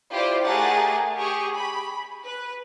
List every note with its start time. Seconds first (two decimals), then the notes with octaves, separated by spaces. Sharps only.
0.11 E4 F4 G4 C5 D5
0.46 A3 G4 G#4 A#4 F#5 A6
1.20 G4 G#4 C#6
1.58 B5
2.23 B4